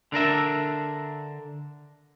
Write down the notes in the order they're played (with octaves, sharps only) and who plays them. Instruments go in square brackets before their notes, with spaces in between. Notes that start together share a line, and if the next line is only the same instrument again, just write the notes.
[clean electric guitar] D3 D4 A#4 E5